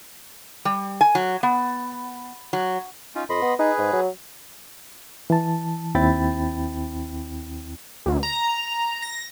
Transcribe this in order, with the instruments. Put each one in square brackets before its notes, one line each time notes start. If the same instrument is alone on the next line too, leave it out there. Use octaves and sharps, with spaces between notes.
[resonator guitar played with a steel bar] G3
G#5
F#3
B3
F#3
[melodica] C#4 D#4 F4
[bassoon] F2 [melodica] D#5 B5 C6
[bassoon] B3
[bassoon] D#4 [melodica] G#4 B4
[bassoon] G#2
F#3
[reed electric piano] E3 A5
D#2 C4 E4 G5 B5 A6
[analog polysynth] D2
A#5
A#6